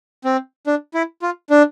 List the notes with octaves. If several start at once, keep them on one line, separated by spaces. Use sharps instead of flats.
C4
D4
E4
F4
D4